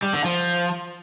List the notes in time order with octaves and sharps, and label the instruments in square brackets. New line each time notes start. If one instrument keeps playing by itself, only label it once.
[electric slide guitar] G3
D3
F3